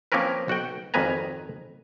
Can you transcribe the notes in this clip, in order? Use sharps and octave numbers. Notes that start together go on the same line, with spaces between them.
F3 A#3 C4 C#4 A#4 B4
B1 F#4 F#5 G5
G#1 F2 D#3 B4 G#5 A#5